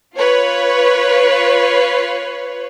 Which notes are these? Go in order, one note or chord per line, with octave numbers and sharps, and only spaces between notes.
F4 B4 C#5